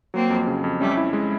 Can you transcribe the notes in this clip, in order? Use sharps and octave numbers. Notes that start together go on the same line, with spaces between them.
F#3 A#3 C4
F2
C#3
F2
G3 A3 C#4
E4
G#3